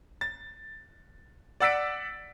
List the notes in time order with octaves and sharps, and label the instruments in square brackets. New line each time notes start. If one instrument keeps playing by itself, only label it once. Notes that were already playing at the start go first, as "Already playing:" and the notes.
[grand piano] A6
D5 F#5 E6 A6 B6 D7